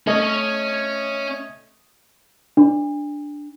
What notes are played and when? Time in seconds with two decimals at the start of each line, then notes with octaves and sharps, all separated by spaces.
0.07 A3 C#4 C#5 D#5
2.57 D4